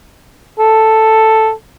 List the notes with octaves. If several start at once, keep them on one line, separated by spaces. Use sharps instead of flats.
A4